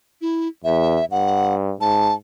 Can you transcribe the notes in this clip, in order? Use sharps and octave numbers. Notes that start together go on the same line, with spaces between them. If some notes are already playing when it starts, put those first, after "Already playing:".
E4
E2 E5
G2 F#5
G#2 A5